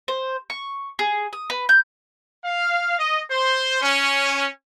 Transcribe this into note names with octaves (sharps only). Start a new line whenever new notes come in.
C5
C#6
G#4
D#6
B4
G6
F5
D#5
C5
C#4